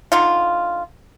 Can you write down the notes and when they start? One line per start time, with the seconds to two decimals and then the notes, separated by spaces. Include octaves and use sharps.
0.12 D3 D#4 F4